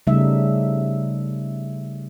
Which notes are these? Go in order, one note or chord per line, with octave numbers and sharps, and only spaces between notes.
C#3 G3 A3 D#4 E5